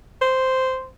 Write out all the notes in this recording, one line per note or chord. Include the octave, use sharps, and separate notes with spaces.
C5